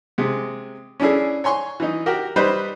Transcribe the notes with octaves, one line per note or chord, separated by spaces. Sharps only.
C3 G#3
C#4 D4 E4 G#4 A4
C#5 G#5 C6 C#6
E3 D#4
F#4 G4 A#4
G3 D#4 B4 C5